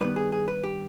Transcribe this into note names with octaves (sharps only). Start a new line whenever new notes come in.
G2 D#3 B3 B4
G#4
G#4
B4
G4